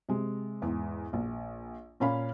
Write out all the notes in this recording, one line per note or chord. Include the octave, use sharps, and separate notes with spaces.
C3 G#3
E2 G#2
A#1
A#2 C#4 F5 B5